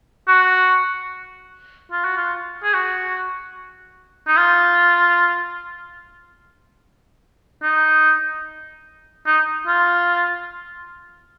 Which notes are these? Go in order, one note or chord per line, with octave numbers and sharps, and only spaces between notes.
F#4
F4
F#4
F4
G#4
F#4
D#4
F4
D#4
D#4
F4